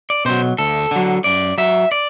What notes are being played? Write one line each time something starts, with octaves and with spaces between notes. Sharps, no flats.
D5
B2 F#3 C5
D2 A4
D3 F#3
F#2 D5
F#3 E5
D5